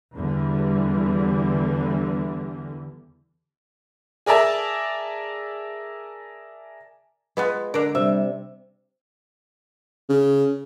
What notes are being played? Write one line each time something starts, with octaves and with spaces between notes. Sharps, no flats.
E2 D3 E3 G3
G#4 A#4 D5 E5 A5
G#3 B3 F4 B4
D3 D4 A#4
C3 G3 E5
C#3